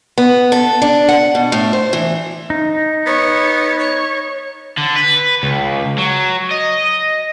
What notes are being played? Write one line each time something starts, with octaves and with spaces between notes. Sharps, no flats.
B3
A4
D4
F#5
B2
A2
C5
E3
D#4
B3 C#5
C#5
D3
B4
C#2
F#3
D#5